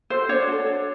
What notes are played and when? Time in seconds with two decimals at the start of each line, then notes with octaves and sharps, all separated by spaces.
0.10 F#4 A4 C5
0.29 D4 C#5
0.48 F#4 A4
0.67 D4